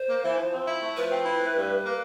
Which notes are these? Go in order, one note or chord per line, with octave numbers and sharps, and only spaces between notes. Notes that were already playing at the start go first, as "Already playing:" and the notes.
Already playing: C5
A#3
E3
F3
C4
E4
A3
F3 B4
C4
E4
A3
G2
G3
A#3